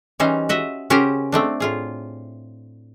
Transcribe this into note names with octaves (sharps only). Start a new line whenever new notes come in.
E3 G3 C#4 D#4 C5
F#4 D#5 E5
C#3 C#4 F#4 G4 A#4 C5
A3 C4 D4
A2 F4 G#4